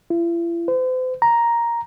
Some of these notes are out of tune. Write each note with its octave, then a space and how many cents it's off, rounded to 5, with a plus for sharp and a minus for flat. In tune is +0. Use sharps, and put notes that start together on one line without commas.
E4 +45
C5 -40
A#5 +5